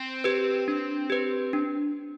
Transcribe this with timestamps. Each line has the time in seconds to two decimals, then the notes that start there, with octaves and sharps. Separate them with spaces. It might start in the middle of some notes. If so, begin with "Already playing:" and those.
Already playing: C4
0.24 G4 B4
0.68 D4
1.10 G4 B4
1.53 D4